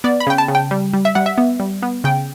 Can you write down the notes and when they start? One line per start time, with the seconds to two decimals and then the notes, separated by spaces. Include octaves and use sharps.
0.04 B3 D5
0.20 B5
0.27 C#3 G5
0.38 A5
0.48 C#3
0.55 G5
0.71 G3
0.94 G3
1.05 E5
1.15 G3 F#5
1.26 E5
1.38 B3
1.60 G3
1.82 B3
2.04 C#3 G5